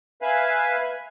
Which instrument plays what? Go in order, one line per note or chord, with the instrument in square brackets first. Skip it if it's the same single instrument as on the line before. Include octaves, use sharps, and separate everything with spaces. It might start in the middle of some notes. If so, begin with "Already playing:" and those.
[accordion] B4 E5 F5 G#5 F#6